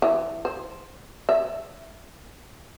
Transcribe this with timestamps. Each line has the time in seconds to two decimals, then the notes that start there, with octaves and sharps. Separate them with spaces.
0.02 E3
0.45 C5
1.29 E5